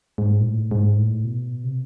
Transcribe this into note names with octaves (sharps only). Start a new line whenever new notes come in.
G#2
A#2
A2
G#2
A2
B2
C3